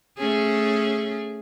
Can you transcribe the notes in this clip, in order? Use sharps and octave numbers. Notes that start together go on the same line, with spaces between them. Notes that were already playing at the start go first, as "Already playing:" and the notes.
A3 C#4 G#4